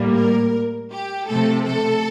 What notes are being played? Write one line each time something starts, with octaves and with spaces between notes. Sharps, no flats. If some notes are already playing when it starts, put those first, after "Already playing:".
Already playing: A2 G3 A#3
A#4
G4
C3 F3 A3 A4
A4